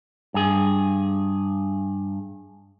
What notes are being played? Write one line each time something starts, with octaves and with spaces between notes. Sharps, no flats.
G2 G#4